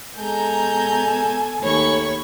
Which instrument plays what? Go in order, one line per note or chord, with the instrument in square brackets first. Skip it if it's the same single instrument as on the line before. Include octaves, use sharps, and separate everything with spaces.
[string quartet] B2 A4 G#5 [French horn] G#3 [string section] A#5 G6
[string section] D#2 B5 [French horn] A3 [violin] C#5 C#6